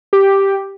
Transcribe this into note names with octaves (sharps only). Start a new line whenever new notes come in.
G4